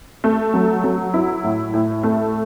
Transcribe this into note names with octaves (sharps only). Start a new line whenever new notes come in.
A3
F#3
F#3
E4
A2
A2
A3